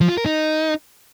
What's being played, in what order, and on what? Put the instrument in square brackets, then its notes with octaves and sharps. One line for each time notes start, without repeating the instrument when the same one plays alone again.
[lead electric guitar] F3
F4
A#4
D#4